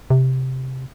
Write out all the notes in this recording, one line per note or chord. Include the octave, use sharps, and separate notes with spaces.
C3